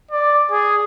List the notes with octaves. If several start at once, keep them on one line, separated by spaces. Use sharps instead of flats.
D5
G#4